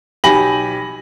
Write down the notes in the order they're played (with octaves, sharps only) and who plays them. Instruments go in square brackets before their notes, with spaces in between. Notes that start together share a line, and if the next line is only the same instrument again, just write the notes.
[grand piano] B1 G4 G#5 B5 A#6 F#7